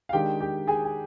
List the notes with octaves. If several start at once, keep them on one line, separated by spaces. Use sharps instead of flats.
F5
D#3 G#3 D4 G4 G5
G4 G5
G#4 G#5
G#5